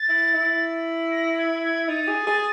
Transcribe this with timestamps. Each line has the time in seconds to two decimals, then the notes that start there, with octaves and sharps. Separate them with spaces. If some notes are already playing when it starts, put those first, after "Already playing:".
Already playing: A6
0.09 E4
0.34 E4
1.11 A#6
1.38 G#6
1.63 G#6
1.89 D#4 A6
2.08 G#4
2.27 G#4